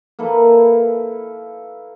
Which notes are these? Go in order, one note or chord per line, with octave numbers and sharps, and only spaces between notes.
A#3 E4 A4 B4